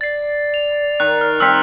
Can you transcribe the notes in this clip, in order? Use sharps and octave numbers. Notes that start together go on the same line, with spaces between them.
D5 A6 C7
F7
D#3 F#6
F6
D#3 G3 C4 E6 F6 B6